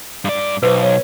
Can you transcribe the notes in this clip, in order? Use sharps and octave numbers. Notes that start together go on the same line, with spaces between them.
G2 D5
B1 B4 C5
C#5